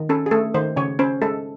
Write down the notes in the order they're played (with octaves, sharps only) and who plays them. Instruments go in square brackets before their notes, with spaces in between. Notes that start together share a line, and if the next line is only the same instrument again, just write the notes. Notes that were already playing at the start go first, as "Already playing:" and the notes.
Already playing: [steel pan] D#3
C#4 A4
G#4
A3 A4
D#3 C5
C#3 C#5
C#4 C5
G#3 A4